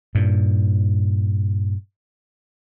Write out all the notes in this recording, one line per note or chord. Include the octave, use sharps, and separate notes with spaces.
G2 A#2